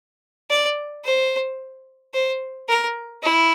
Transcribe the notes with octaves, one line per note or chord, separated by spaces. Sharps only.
D5
C5
C5
A#4
E4